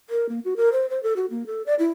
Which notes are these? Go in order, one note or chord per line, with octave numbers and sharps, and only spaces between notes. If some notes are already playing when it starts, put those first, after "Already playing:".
A#4
A#3
F#4
A#4
C5
C5
A4
F#4
A#3
A4
D5
E4